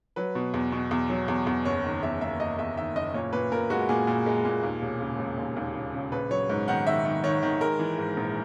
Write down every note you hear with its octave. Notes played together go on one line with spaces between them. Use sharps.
F#3 B4
B2
E2
B2
E2
F#3
E2
E2
F#1 C#5
D#3
E2 E5
A#3 E5
F#1 D#5
E2 E5
D#3 E5
F#1 D#5
A#2 C#5
A#2 B4
A#2 A#4
G#3 F#4
A#2 G#4
A#2
G#3
A#2
D#2
E1
C#3
E1
D#2
D#2
C#3
C#3
A#1 B4
F#3 C#5
G#2
D#3 F#5
D#3 E5
D#3
D#3 C#5
D#3
G#3 A#4
E3
G#2
A#1